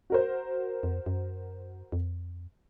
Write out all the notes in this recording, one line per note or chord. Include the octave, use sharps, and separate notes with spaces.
F#4 A#4 C5
F2
F#2
F2